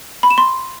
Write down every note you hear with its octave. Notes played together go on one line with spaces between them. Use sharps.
B5
E7
C6